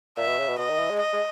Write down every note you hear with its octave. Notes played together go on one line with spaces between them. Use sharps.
A#2 E5
B2
C#3
B2
B2 D#5
D#3
E3
G#3
D#5
G#3